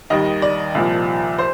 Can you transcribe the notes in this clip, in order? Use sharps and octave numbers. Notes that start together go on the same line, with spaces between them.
D#2 D#3 G3 D#5
D5
C2 A#2 F3
C5